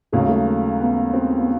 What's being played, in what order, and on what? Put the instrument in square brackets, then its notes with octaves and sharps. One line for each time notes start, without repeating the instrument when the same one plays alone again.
[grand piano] D#2 C#3 F#3 [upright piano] A3
[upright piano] G#3
A3
A#3
B3
C4
B3